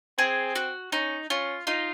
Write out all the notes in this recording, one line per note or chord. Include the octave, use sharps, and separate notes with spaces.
C4 G#4
F#4
C#4 D#4
C#4 F4
D#4 F4